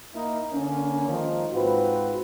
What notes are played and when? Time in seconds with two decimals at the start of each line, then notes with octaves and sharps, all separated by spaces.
0.14 A#3 D#4 E4
0.53 D3 A#3 C#4
1.08 D#3 F3 G#3 A#3 D#4
1.52 G#2 C4 F4 F#4 B4